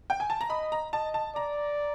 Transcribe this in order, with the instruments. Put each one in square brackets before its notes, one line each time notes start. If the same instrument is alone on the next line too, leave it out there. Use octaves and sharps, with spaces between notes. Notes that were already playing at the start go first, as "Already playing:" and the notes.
[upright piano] G5
G#5
A5
A#5
[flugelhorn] D#5 [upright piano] B5
[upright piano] A#5
[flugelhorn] D#5 [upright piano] A5
[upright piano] A5
[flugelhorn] D5 [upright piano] A#5